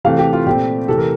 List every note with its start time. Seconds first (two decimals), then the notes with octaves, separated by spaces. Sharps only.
0.05 C3 E3 A3 C4 F5
0.19 G4
0.33 F4
0.46 A#2 A3 C4 G4
0.88 C3 E3 A3 A4
0.98 A#4